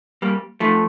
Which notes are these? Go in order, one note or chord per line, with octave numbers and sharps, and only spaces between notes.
G3 A#3
F3 A3